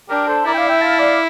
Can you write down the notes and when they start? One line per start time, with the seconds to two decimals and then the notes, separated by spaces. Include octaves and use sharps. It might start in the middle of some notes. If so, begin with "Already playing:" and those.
0.09 D4 G4 A#4
0.28 A4 C5
0.46 E4 A#4 D5
0.53 G5
0.57 D5 F5
0.69 E5 G5
0.81 F5 A5
0.99 D5 F5